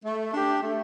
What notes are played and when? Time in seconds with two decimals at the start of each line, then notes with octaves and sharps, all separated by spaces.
0.04 A3
0.33 D4 G4
0.62 A3